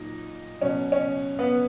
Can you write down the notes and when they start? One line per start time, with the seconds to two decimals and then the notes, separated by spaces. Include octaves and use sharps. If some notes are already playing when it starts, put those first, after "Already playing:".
Already playing: A#2 F#3 D#4
0.61 B2 F#3 C#4
0.92 C#4
1.39 B3